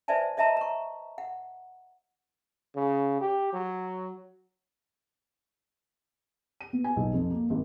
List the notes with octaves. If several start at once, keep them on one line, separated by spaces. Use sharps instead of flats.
B4 C5 D5 E5 G#5 A5
C#5 D#5 E5 A5 A#5 C6
A#5 C#6
F#5
C#3
G4
F#3
D#7
B3
G#5
B1
F2
A#3
G#1